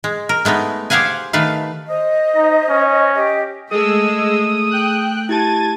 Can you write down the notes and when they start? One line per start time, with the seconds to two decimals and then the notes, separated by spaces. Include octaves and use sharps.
0.04 G#3
0.29 A#4
0.45 G#3 A3 B3 D#4
0.90 G4 G#4 C5 F5 F#5 G#5
1.33 D#3 A3 B4 F5
1.88 C5 D#5
2.36 D#4
2.69 C#4
3.14 G4 D#5
3.71 G#3 A3 G#4 A4 D#6 E6
4.71 G5 F#6
5.29 E4 G4 A5 G#6 A6 D#7